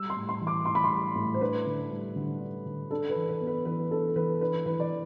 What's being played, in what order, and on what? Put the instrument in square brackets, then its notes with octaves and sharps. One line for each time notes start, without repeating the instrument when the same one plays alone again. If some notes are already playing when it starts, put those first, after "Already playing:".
Already playing: [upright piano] G3 E6
C6
A2
C6
E3
D6
A2 C6
B5
C6
G3
A2
C5
D4 B4
D3
G3
D3
D4
D3
D4 A4
B4
E3
B4
B3
B4
E3 B4
D4 A4
E3 B4
D4 B4
E3 B4
D5